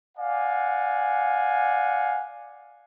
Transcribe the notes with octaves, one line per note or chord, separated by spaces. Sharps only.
D5 F5 F#5 G#5